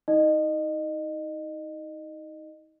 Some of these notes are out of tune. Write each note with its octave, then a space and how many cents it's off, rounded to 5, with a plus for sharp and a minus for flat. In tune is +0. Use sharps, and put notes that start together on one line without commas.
D#4 +30 D#5 -25